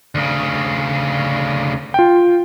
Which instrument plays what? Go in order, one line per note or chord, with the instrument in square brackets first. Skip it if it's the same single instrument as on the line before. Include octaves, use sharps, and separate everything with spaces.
[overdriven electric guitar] D2 C#3
[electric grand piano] F4 G5